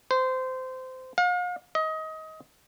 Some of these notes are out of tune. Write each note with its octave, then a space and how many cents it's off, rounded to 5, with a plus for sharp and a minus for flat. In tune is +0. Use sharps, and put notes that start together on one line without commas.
C5 -20
F5 +40
D#5 +25